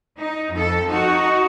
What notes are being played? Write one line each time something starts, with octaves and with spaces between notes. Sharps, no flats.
D#4
F2 A4
D#4 F#4